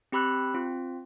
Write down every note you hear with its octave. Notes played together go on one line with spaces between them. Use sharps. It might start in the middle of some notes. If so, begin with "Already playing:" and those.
C4 G4 B5 E6 F#6
C4 F4